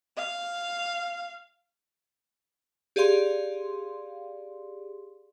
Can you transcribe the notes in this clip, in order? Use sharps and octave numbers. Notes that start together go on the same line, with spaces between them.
F5
G4 G#4 D5 F5 C6